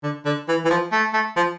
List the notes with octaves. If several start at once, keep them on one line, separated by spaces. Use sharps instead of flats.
D3
D3
E3
E3
F3
A3
A3
F3